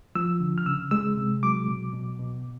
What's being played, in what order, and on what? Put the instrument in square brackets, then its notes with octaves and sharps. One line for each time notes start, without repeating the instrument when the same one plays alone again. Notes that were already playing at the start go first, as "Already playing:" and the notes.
[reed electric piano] F3 E6
D3
F6
C#3 E6
G#3 E6
C3
F#3 D6
B2
B2
B2